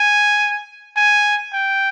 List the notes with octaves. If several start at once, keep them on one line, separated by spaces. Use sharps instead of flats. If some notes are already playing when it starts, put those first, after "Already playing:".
Already playing: G#5
G#5
G5